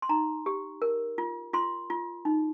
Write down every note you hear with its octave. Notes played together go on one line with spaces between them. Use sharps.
C6
D#4 A#5
G4
A#4
F4
F4 C6
F4
D#4